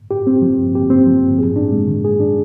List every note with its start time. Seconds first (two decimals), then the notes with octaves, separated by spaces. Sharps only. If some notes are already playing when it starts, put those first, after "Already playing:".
0.11 G4
0.27 C4
0.42 F3
0.58 G2
0.75 G4
0.90 C4
1.06 F3
1.23 G2
1.39 G#4
1.56 D4
1.72 G#3
1.88 D#3
2.04 G#4
2.20 D4